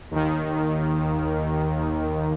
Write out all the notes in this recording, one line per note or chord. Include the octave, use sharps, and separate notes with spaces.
D#2 D#3